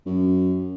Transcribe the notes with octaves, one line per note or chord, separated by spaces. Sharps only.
F#2